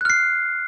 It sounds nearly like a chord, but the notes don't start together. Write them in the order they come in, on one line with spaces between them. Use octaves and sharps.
F#6 F6 C7